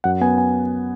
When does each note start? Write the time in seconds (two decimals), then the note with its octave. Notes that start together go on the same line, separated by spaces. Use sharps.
0.04 F#2 F#5
0.21 B3 G#5
0.38 G#5